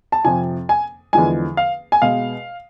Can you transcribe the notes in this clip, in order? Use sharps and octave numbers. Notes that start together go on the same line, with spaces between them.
A5
F2 C3 F3 G#5
G#5
E2 D3 F3 G#3 G#5
F5
G#5
B2 G#3 F5